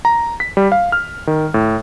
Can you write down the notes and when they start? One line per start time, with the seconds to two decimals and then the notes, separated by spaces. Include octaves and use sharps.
0.05 A#5
0.40 B6
0.57 G3
0.72 F5
0.92 F6
1.27 D#3
1.54 A2